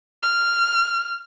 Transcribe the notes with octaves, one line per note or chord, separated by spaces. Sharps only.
F6